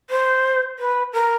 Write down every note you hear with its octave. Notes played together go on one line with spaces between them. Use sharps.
C5
B4
A#4